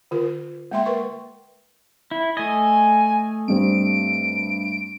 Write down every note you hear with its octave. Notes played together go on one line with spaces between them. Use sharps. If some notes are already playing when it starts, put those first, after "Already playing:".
D3 F4 A#4
G#3 A#3 E5 G5 C6
A#4 B4 C6 C#6
E4
A3 D#5 G#5
G2 G3 C4 D7